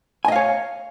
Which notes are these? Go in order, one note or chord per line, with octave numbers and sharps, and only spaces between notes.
C#5 D#5 F5 G#5